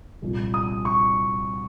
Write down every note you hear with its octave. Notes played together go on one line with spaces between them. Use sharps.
C2 A#2 F3
D#6
C#6